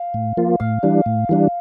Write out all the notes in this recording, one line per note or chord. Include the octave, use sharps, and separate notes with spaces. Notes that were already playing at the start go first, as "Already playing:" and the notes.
Already playing: F5
A2
F3 A#3 F4
A2 F5
E3 G3 D4
A2
E3 G3 D4